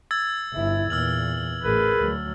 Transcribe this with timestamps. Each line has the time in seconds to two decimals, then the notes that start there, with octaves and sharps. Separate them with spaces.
0.11 E6 G#6 A6
0.53 G1 E4
0.90 E2 A#2 E6 F6 F#7
1.63 A1 G#4 A#4 B4
1.99 D2 F#3